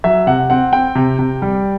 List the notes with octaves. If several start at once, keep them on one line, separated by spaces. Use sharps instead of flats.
F#3 E5
C3 F#5
C4 F#5
C4 G5
C3
C3
G3